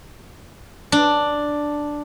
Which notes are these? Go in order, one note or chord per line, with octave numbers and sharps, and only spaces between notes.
D4